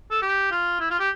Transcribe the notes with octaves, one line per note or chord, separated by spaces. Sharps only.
A4
G4
F4
E4
F4
G4